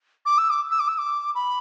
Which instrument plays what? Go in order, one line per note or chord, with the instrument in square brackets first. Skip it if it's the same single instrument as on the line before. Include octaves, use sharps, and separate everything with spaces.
[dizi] D6
E6
D6
E6
D6
E6
D6
B5